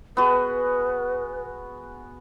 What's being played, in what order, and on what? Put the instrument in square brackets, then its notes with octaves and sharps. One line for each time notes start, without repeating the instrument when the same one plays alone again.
[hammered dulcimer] B3 F#4 G#4 [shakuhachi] B4